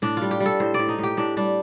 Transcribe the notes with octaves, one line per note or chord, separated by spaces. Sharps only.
A2 D4
G3 F4
G4
G3
A4
A2 C5
A2 D5
D#4
A2 G4
A2 D4
G3 D4